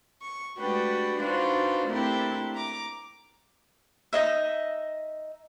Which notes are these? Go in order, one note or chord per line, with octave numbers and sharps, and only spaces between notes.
C#6
G#3 A3 D4 F#4 G4 B4
D4 D#4 F4 F#4 B4 C5
A3 A#3 C4 D4 E4 G4
A#5 D6
D#4 F4 D#5 E5